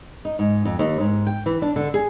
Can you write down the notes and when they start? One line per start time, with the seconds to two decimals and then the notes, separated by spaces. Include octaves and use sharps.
0.25 D#4
0.39 G#2
0.65 F2
0.79 D#2
1.00 G#2
1.27 G5
1.46 E3
1.62 D4
1.76 D3
1.94 G#4